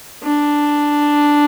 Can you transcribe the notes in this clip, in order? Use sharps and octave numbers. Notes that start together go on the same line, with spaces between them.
D4